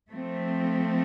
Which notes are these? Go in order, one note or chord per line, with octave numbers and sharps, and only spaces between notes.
F3 A3 C4